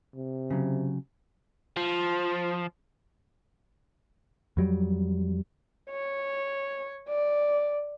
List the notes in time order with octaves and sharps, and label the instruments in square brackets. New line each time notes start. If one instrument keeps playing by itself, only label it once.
[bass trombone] C3
[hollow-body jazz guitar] C#3 F#3
[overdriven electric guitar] F3
[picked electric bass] F2 F#3 G3
[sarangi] C#5
D5